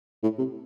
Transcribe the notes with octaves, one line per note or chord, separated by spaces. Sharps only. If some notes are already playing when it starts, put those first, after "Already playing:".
A2
C3